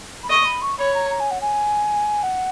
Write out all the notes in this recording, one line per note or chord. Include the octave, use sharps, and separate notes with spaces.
B5
D#5 C#6
B5
C#6
C#5 B5
A#5
A#5
G#5
F#5
G#5
F#5